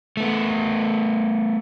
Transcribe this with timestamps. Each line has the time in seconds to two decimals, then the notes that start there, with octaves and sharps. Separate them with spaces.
0.17 A3 B3